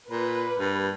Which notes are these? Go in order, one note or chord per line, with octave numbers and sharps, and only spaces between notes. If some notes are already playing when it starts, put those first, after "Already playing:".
A#2 B4
G2